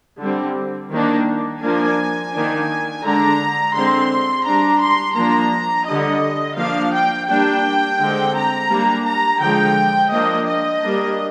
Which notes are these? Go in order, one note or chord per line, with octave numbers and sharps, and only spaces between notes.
D3 G3 C4
D#3 A#3 D4
F3 A#3 D4 G#5
D#3 A#3 D4
D3 G#3 D4 A#5
D3 G#3 C4 C6
G3 D4 A#5
C6
F3 A#3 D4 A#5
D3 G3 D4 D#5
F3 A#3 D4 F5
G5
G3 A#3 D4 G5
D3 G#3 C4
A#5
G3 A#3 D4
A#5
D3 F3 G#3 G5
F3 A#3 D4 D#5
D#5
G3 A#3 D4